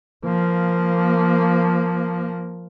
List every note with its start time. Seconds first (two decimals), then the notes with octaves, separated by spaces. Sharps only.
0.25 F3 A#3